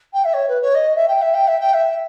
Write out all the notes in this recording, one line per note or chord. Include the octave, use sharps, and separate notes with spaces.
G5
E5
C#5
B4
C#5
D#5
E5
G5
E5
G5
E5
G5
E5